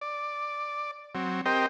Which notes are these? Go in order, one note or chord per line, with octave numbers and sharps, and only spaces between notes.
D5
F#3 C4
C4 G4 A#4 C5 D#5 G5